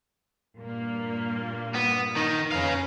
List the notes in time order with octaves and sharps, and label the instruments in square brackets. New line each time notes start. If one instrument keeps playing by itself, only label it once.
[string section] G2 A#2 A#3
[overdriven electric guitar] B3
D#3 D#4
[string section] F2 B4 A#5 [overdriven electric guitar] C#4 F5